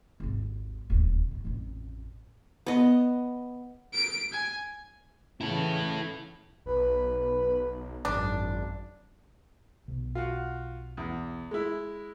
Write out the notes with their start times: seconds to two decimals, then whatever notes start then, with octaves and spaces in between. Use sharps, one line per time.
0.20 G#1 D#2
0.90 D#1 D2
1.31 D#2 D#3
1.45 A1 F2
2.67 B3 D#5
3.94 D7
4.33 G#5
5.41 C#3 E3 E4 A4
6.66 B1 B4
8.05 G#1 F#2 D4
9.88 B1
10.15 F4 F#4
10.97 E2
11.51 G#3 E4